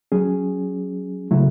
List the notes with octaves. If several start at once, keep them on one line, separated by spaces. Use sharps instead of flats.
F#3 C#4 G#4
C#3 F#3 A3 E4